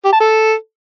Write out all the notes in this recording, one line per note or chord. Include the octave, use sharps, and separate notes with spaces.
G4
A5
A4